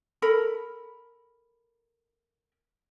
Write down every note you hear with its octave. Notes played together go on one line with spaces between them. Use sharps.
A4 A#4 B5